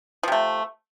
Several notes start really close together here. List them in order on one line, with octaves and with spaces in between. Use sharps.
F3 C3 A3